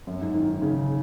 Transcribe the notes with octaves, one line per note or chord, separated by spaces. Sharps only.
F#2
G#2
D#3
D#3
C#3